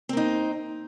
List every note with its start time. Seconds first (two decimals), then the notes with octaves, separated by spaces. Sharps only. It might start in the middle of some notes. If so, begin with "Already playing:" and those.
0.09 C4
0.13 A#3
0.17 D#4